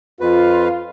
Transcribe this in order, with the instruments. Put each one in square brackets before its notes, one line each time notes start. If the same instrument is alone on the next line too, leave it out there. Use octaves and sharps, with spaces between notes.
[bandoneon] F2 B4 [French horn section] F4